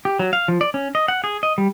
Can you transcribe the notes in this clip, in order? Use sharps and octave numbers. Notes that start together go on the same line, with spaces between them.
G4
F#3
F5
F3
D5
C#4
D#5
F#5
G#4
D#5
G3